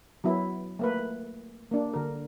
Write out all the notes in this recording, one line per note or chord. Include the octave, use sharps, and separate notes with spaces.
F#3 B3 E4
A3 A#3 B4
A#3 D4
D3 A#4